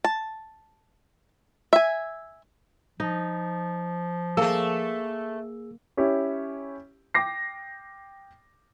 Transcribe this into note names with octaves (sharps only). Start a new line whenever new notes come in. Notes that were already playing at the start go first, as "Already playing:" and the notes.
A5
E5 G#5
F3 D#4
A3 A#3 G#4 A4 E6
C#4 E4 G4 C#5
G5 D6 A#6 C7